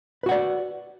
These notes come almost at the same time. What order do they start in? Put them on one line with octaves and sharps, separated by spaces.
B4 F#4 F#5 D5